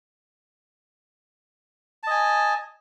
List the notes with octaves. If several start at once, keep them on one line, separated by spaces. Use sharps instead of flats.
D#5 G#5 A5